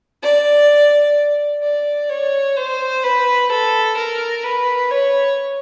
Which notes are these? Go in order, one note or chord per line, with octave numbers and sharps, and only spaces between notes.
D5
D5
C#5
C5
B4
A4
A#4
B4
C#5